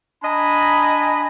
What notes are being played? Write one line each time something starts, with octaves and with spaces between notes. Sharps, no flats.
D4 D#5 G#5 A#5 B5